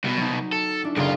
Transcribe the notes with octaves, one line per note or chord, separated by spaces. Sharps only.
C2 B2
F#3 D#4
A4
C#4 D4 E4
F#1 B1 F4 G#4 D7